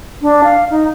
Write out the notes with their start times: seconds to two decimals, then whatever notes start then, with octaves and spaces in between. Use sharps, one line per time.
0.22 D4
0.44 F5
0.70 D#4